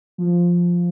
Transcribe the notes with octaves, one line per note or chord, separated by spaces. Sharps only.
F3